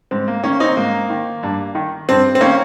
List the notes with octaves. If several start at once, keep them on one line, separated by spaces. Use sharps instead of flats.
G#2 C4
A#3
D#3 A#3 C#4
C4 D#4
G#2 A#3
D#3
G2
D#3
G2 C4
C4
D#3 A#3 C#4